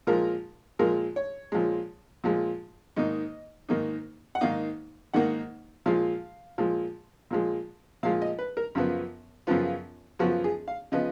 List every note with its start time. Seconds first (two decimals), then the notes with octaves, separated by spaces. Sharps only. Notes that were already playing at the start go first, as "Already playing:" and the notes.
0.07 A#2 F3 G#3 A#4
0.79 A#2 F3 G#3 A#4
1.16 C#5
1.52 A#2 F3 G#3
2.24 A#2 F3 G#3
2.96 G#2 D#3 A#3 D#4 D#5
3.69 G#2 D#3 A#3 D#4
4.35 F#5
4.41 G#2 D#3 A#3 D#4 F5
5.14 G#2 D#3 A#3 D#4 F#5
5.86 A#2 F3 G#3 F5
6.58 A#2 F3 G#3
7.31 A#2 F3 G#3
8.03 A#2 F3 G#3 F5
8.22 D#5
8.39 B4
8.57 A#4
8.75 F#2 C#3 F3 B3
9.47 F#2 C#3 F3 B3 F4
10.19 F#2 C#3 F3 B3 F#4
10.44 G#4
10.68 F5
10.92 C#3 F3 B3 D#5